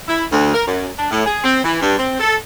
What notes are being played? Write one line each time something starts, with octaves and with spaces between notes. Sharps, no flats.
E4
D2
A#4
F#2
D4
A2
G#4
C4
E3
G2
C4
A4